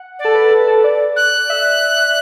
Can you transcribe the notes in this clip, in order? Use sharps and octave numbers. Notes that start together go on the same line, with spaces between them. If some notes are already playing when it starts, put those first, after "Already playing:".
Already playing: F#5
D5
A4
B4
A4
A4
D5
F#6
E5